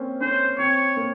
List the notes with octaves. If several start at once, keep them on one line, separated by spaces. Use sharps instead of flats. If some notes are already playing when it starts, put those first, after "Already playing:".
Already playing: A#3 C4 C#4
C#4 C5
C4 C#5
A#3